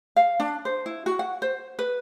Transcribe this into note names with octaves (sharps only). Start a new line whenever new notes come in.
F5
D4
C5
E4
F#4
F#5
C5
B4